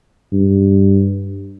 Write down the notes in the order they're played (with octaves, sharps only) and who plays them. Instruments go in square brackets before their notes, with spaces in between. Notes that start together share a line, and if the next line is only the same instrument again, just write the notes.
[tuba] G2